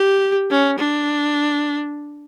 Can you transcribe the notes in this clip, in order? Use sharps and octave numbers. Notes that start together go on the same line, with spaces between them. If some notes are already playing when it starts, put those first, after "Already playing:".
Already playing: G4
C#4
D4